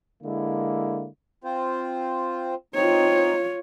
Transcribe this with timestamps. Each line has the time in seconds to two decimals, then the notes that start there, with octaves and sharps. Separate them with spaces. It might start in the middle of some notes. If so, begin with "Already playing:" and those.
0.23 D3 G#3 A#3 E4
1.44 C4 F4 C5
2.75 C4 D#4 F4 C#5